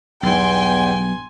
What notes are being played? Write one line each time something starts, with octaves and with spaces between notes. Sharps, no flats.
B1 E2 G2 G5 G#5 C6